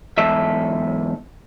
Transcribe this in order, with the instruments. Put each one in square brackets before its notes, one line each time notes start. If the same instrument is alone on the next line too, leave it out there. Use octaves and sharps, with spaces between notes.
[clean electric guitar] E2 G#2 A4 E5